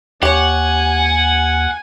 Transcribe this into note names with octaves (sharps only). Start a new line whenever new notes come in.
D#2 G4 C#5 F#5 G#5